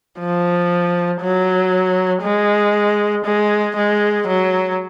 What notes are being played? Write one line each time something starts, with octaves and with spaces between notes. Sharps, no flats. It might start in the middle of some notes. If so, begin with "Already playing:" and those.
F3
F#3
G#3
G#3
G#3
F#3